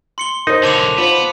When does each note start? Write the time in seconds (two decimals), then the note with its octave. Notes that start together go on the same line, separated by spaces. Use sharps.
0.18 C6 C#7 G7
0.47 D#4 A#4 C5
0.63 B1 D3 A5 D6 F7
0.98 B3 F4 C5